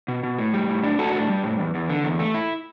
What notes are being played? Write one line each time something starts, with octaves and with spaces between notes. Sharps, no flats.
B2
B2
A2
G3
A2
D4
A2 F#4 A4
D4
G3
A2
E2
E2
D3
E2
A3
E4